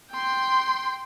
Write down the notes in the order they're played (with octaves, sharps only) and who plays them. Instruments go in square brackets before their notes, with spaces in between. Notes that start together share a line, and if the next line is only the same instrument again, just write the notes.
[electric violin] G5 C6